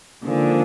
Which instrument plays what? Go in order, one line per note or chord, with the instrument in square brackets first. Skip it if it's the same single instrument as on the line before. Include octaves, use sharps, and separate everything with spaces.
[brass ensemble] G#2 F3 A#3 D4 G#4 [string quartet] D3